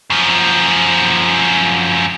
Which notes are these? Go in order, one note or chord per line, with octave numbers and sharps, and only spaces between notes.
F#2 F3